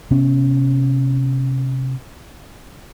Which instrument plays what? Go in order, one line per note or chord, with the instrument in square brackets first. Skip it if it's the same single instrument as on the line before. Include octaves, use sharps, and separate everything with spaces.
[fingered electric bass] C3 B3 C#4